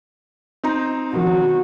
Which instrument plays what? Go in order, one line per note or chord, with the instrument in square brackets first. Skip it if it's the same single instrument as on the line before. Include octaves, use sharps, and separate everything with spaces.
[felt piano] C4 D#4 A#5
[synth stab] B2 D#3 F3 [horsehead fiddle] F#4